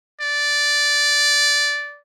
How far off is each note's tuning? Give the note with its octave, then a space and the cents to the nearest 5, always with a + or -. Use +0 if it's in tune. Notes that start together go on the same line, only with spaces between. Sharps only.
D5 -10